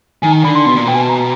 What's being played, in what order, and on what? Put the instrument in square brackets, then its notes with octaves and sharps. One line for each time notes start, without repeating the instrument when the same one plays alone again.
[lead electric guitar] D#3 [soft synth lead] G#5
[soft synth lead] A#5
[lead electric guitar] D3 [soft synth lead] B5
[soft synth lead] C6
[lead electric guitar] B2 [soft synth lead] C6
[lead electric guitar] A#2
[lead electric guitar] B2 [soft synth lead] G5
[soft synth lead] G#5
A5
A#5